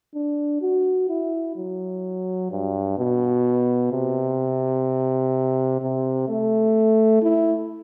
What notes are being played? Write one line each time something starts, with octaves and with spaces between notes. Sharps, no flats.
D4
F#4
E4
F#3
G2
B2
C3
C3
A3
E4